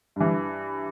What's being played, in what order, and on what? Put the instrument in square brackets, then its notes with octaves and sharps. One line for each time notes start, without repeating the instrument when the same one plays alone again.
[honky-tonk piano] G2 E3